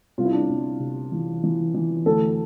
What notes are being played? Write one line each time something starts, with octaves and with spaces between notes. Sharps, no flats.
C2 F4
E4
D4
E4
C2
C3
E3
E3
E3
D2 A4